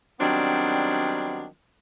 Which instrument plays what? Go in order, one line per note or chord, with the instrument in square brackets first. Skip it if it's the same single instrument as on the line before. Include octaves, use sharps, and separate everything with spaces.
[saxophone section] D#3 F#3 G3 B3 C4 D4